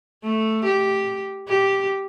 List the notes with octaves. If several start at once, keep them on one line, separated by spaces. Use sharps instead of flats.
A3
G4
G4